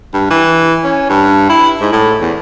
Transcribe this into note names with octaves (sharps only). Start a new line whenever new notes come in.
G2
E3
C#4
G2
E4
G#2
A2
E2